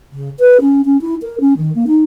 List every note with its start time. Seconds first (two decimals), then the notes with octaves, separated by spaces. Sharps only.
0.12 C#3
0.40 B4
0.61 C#4
0.85 C#4
1.01 E4
1.22 A#4
1.40 C#4
1.57 D#3
1.75 A#3
1.87 D#4